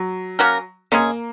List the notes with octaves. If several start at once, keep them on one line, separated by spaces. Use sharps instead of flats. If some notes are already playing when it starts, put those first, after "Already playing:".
Already playing: F#3
A#3 C#4 F#4 A#4
C#3 G#3 A#3 C#4 G#4